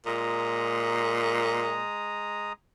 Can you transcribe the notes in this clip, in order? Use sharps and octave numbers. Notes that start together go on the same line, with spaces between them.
A#2 G#3 A#5 D#6